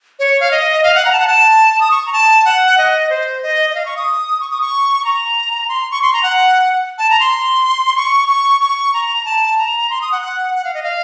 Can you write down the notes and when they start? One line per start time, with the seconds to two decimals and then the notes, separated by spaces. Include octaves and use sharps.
0.19 C#5
0.40 F5
0.51 D#5
0.83 F5
0.95 F#5
1.05 A#5
1.12 A5
1.20 F#5
1.27 A5
1.80 D#6
1.91 C#6
2.06 A#5
2.13 A5
2.45 F#5
2.78 D#5
3.10 C5
3.43 D#5
3.70 D#5
3.75 F5
3.86 C#6
3.97 D#6
4.40 C#6
4.51 D#6
4.61 C#6
5.05 A#5
5.69 C6
5.91 C#6
6.02 C6
6.13 A#5
6.23 F#5
6.98 A5
7.10 A#5
7.20 C6
7.97 C#6
8.28 C#6
8.61 C#6
8.94 A#5
9.25 A5
9.58 A#5
9.90 C6
10.01 D#6
10.12 F#5
10.22 F#5
10.55 F#5
10.64 F5
10.74 D#5
10.83 F5